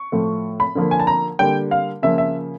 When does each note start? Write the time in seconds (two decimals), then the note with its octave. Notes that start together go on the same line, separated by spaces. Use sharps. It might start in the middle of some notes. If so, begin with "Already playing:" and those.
Already playing: C#6
0.12 A2 F3 A3
0.60 B5
0.75 D3 F3 A#3
0.91 G#5
0.99 A5
1.07 A#5
1.39 D3 G3 A#3 G5
1.71 F5
2.02 C#3 F3 A#3 E5
2.18 E5